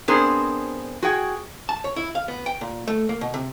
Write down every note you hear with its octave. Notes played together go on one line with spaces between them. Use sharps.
B3 C4 D4 G#4 A#4 C5
F#4 G#4 G5
A5
C#5
E4
F5
B3
G5
A#2
A3
A#3
B2
C3